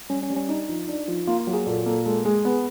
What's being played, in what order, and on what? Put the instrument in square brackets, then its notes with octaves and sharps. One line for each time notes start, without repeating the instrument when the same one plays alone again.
[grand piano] G3 [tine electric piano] C#4
[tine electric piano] C#4
[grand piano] G3
[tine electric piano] C#4
[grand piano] D4 [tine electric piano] D#4
[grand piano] F3
D4
F3
[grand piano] A#3 [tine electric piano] F4
[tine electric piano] F4
[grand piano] F#3
[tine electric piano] G#4
[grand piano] A#2 [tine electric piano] A4
[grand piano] A#3 [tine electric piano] A4
[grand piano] G#3 [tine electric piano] A4
[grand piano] G#3 [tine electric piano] G#4
[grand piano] B3 [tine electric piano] G#4